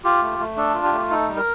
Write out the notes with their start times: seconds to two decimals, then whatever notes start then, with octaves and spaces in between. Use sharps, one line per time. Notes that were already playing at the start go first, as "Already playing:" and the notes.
0.04 F4 G4
0.22 A3
0.40 A3
0.57 D4 A4
0.74 F4
0.84 G4
0.92 A3
1.10 D#4 A4
1.28 G3
1.37 A#4